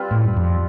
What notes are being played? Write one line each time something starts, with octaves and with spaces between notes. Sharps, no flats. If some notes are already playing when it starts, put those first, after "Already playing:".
Already playing: G3 C4 F4 B4
A2
G2
F2